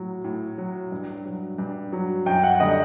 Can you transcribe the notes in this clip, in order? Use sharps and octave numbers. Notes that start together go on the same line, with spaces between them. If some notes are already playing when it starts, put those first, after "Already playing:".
Already playing: A2 F#3
A2
F#3
G2
F#3
G2
F#3
F#2 G5
F#5
D3 G3 D#5